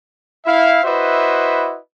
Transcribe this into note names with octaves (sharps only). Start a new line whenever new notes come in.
E4 E5 F5
E4 F#4 B4 C5 D#5 E5